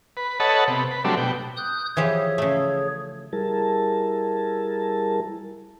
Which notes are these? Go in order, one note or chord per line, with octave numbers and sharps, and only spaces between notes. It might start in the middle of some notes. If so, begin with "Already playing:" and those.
B4
A4 B4 C#5 D#5 F#5 A5
C3 B3
B4
F#3 G3 A3 C4 D4
B2 G5
D#6 F#6 G6
E3 F3 G4 G#4 C#5
C#3 A3
G3 E4 G#4 A#4 A5